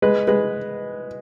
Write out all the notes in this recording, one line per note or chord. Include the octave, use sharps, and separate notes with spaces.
G#3 B4
G#3 B4